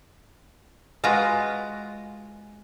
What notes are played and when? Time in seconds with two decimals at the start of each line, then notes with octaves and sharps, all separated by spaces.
1.04 G#3 F4 F#4 B4 A#5